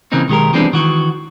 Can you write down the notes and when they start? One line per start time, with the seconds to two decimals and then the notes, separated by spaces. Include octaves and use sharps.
0.12 C#3 E3 A#3 C4 D#4
0.28 B1 D#3 G#3 G4 A#4
0.53 E3 G3 G#3 B3 C4 D4
0.73 D#3 E3 F#4